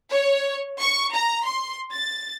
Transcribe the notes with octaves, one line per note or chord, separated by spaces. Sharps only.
C#5
C#6
A#5
C6
A6